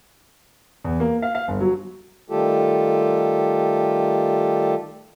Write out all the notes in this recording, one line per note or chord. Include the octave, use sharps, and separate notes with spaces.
E2
A#3
F5
F5
G1
F#3
D#3 G3 A3 F4 G4 A4